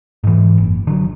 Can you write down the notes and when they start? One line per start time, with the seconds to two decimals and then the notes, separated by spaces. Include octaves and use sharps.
0.24 G#2 E3
0.58 F#1
0.87 D3 F#3